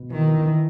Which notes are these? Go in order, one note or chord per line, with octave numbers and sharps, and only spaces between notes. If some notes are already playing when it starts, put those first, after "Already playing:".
Already playing: B2
D#3 E3
E3
E3